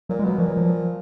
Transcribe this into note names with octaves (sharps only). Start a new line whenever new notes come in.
A#2 F#3
G#3
B2 F#3
A#2 F3
F#3
F3